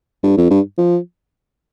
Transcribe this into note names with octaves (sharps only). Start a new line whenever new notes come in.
G2
F2
G2
F3